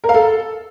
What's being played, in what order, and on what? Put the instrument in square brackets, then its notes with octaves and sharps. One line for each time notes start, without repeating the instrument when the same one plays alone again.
[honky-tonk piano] A#4
F5
A4